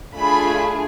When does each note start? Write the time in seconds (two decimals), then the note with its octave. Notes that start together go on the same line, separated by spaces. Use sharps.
0.16 A3 D4 F4 G#4 B5